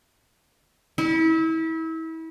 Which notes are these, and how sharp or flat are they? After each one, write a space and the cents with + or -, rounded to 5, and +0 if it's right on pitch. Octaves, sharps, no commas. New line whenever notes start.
E4 -30